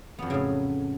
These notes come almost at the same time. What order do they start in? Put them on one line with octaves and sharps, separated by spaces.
B3 F2 F#3 C#3 A2